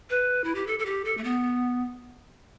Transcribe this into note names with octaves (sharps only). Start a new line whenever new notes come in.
B4
E4
G4
A4
A4
G4
A4
A3
B3